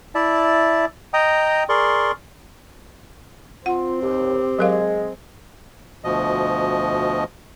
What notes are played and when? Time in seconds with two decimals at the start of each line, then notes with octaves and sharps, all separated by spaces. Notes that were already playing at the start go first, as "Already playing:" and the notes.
0.15 E4 D5 E5 A5
1.13 D#5 G5 A#5 D#6
1.69 G#4 A#4 D5 C6 C#6
3.66 C4 F4 F#5
4.02 D#2 G4
4.59 F#3 G#3 A#4 F5
6.04 D2 B2 F3 D#5